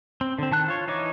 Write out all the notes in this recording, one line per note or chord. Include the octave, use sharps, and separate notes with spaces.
C4
D3 C4
D#3 A5 F#6
F4 C#5
E3 D#4 C#5 D6